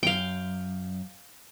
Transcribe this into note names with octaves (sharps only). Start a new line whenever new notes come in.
F#2 F5 G5